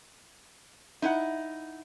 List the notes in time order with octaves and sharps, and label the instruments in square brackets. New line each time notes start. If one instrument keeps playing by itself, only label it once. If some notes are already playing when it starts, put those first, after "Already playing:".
[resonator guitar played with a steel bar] D#4 E4 A4 F#5